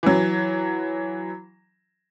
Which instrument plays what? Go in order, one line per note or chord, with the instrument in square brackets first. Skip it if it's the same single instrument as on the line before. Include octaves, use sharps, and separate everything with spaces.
[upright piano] E3 F#3